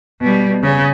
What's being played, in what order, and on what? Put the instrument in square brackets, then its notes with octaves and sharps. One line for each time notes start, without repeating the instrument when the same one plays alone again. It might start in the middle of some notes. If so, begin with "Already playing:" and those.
[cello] B2 G3
C#3